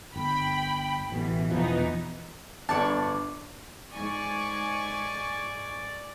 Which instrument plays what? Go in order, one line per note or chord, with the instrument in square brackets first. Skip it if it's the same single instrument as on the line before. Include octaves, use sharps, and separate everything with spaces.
[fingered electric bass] G1 [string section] G5 B5
[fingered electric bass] A1 [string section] B2 E3
[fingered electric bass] E1 B2 F3 [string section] E3 B3 D#4
[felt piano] G1 D3 [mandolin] C#5 D5 A5
[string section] G#2 G#5 C#6 [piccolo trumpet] D5